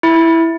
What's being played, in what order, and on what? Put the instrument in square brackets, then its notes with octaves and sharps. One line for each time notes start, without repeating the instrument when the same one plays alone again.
[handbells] E4